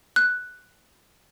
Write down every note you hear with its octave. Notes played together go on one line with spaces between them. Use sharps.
F#6